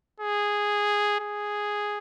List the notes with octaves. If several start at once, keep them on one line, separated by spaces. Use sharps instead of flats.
G#4
G#4